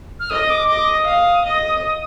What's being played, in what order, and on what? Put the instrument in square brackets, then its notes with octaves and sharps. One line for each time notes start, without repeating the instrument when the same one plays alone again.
[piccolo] F6
[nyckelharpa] D#5 [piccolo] D#6
[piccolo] D6
[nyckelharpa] D#5 [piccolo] D6
[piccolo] D#6
[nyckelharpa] F5
D#5